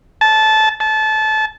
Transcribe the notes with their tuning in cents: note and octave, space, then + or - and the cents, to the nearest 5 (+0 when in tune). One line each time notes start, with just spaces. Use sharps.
A5 -15
A5 -20